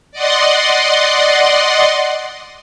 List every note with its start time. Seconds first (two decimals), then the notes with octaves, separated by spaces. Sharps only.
0.12 D5 D#5 F#5 C6